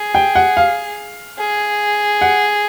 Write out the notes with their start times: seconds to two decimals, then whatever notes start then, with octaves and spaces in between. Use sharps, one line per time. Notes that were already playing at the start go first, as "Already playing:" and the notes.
Already playing: G#4
0.15 G5
0.35 F#5
0.57 F5
1.39 G#4
2.21 F#5